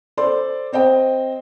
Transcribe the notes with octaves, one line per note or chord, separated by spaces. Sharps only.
A4 C5 D5 C6
C4 C5 D#5 G5